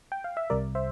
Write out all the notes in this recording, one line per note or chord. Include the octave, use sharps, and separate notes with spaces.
G5
F5
E5
C2 C3 G3 A#4 D5
C5 E5